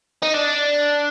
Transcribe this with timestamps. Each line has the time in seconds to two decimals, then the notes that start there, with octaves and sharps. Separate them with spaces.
0.22 D#4
0.34 D4